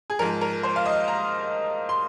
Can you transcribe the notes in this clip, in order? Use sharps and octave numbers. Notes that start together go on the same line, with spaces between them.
G#4
G#2 F3 A#4
A#4
C5
F5
D#5
A#5
C6